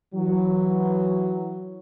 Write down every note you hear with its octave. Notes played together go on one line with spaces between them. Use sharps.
E3 F#3